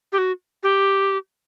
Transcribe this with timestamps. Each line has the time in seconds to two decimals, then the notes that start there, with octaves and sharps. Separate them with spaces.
0.12 G4
0.18 F#4
0.63 G4